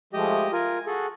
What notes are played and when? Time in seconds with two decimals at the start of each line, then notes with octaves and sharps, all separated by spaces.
0.13 F3 G#3 A3 G4 D#5
0.52 F4 A#4 G#5
0.87 F#4 G#4 A4